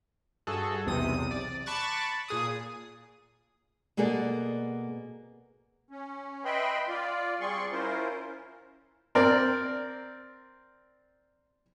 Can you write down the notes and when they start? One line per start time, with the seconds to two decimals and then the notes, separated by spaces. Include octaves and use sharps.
0.47 G2 F#4 G#4 A4
0.86 B1 E2 C3 D#6 D#7
1.31 D5
1.66 A5 B5 C#6 D6 F#6 A6
2.28 A#2 G#4 D#6
3.97 B2 A#3 B3 G#4 A4 D5
5.90 C#4
6.45 B4 D#5 E5 G5 B5 C6
6.89 F4 D5
7.40 G3 C4 G#4 D5 C6 C#6
7.72 C#4 E4 F4 A#4 C5
9.15 C4 A#4 D5